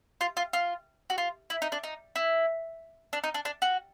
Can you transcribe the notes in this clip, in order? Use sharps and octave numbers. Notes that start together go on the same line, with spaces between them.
F4
F4
F4
F#4
F4
E4
D#4
D4
D#4
E4
D4
D#4
D4
D4
F#4